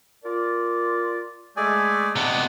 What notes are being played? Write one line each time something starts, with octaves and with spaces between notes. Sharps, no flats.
F4 A#4 D5
G#3 A3 G#4 D5 G#5
C3 B3 D4 D#5